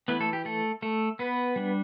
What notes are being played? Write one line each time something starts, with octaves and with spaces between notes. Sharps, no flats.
E3 A3 B3 E4 B4
A3 A4
G4
A3 A4
A3 A4
B3 B4
G3 D4